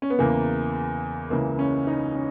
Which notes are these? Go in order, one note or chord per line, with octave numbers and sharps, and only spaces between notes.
C#4
B3
E2 C#3 E3 A#3
C#2 C#3 E3 A#3
C#4
D#4
C#4